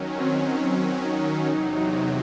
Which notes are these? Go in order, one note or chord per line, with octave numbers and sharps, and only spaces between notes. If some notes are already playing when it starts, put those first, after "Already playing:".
Already playing: D#3 F#3 C#4
C4
C4
D#4
E2 C3 F#3